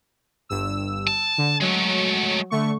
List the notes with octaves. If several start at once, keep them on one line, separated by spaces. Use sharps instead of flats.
G1 G2 E6
A5
D3
F#3 G#3 A3
D3 A3 C#6